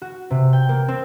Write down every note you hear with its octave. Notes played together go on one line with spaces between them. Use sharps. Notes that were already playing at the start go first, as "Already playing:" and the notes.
F#4
C3
G5
A#3
C4